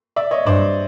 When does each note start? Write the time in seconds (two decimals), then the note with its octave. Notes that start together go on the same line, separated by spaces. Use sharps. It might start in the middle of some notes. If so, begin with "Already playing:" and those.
0.16 D5 E5
0.31 C#5 D#5
0.46 G2 C5 D5